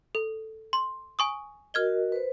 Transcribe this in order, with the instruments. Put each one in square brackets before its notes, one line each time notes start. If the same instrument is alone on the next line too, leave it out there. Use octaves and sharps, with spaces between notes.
[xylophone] A4
C6
G#5 C#6 D#6
[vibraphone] F#4 A#4 D#5 [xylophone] F6 G#6 G7
[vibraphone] B4 C5